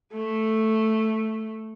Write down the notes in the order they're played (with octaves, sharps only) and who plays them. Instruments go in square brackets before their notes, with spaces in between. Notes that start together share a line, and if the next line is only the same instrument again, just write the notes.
[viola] A3